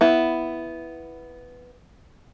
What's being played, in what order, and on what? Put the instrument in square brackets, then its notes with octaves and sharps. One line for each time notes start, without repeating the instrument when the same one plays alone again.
[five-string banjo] B3 E4